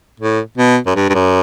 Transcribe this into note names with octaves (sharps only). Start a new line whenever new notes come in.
A2
B2
F#2
G2
G2
F#2